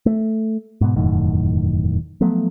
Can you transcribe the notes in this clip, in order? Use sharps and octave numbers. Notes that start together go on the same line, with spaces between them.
A3
G#2 B2
E1 F#2 A2 D#3
F3 F#3 A3 B3